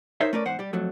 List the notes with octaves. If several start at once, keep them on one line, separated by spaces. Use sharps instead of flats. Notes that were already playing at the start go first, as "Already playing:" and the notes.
D#4 A#4 C5 C#5 E5
A3 C#4 A#4 B4 D5
E2 G#2 C5 F#5
G3 G4
F2 F#3 A3